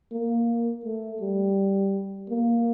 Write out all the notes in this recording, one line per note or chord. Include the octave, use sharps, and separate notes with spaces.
A#3
A3
G3
A#3